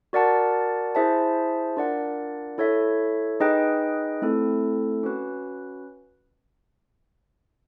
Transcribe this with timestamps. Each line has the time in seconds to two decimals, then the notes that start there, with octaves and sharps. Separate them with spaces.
0.13 F#4 A#4 D5 F#5 A5
0.95 E4 G#4 C5 E5 A5
1.77 D4 F4 A#4 D5 F#5
2.58 E4 A4 C#5 E5
3.40 D#4 G#4 B4 D#5 G5
4.22 A3 C4 E4 A4
5.03 C#4 F#4 B4